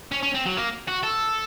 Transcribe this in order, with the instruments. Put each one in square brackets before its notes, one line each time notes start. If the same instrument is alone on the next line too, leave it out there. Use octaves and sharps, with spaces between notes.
[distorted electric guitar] C#4
C#4
C4
F#3
A#3
F#4
A4